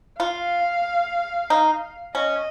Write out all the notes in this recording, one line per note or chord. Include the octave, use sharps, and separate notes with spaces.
F4 F5
D#4
C#4 D#5